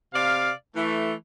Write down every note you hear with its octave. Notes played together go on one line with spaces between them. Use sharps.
C3 D5 F5
E3 A3